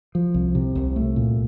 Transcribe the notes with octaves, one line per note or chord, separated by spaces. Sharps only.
F3
C2
C3
C2
A3
A#2